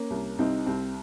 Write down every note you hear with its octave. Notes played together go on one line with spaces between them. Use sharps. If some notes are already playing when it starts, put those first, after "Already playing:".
Already playing: A#3 C#4
C2
C2 C4 D#4
C2 C4